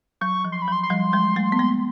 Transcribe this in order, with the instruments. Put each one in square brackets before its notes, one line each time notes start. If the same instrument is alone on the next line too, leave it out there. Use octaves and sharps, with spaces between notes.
[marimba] F#3 [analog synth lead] C#6
[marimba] F3
[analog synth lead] C6
B5
[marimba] F#3 [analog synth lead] C6
[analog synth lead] C6
[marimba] F3 G3
F#3 G#3
G3 A3
B3
G#3 A#3